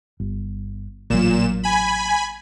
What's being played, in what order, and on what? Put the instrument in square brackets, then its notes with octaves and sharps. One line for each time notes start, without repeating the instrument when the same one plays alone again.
[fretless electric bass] G1
[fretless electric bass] A1 F#3 [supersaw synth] A#2 E7
[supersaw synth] G#5 B5